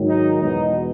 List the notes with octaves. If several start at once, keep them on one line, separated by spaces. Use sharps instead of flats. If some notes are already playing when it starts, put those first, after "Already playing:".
Already playing: G#2 D#3 F#3
D#4
E2 B2 G#3 D#4